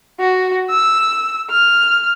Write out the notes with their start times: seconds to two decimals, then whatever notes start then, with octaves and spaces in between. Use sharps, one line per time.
0.20 F#4
0.70 E6
1.51 F6